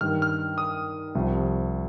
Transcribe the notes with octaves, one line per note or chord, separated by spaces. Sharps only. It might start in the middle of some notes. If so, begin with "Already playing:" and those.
G2 D#3 F6
F6
D#6
C2 C3 F3